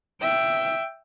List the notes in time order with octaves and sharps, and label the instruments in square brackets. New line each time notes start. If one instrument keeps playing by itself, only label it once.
[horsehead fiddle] E5 G5